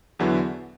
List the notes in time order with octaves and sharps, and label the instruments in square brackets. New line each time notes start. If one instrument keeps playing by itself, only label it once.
[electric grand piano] E2 D3 F#3 B3 E4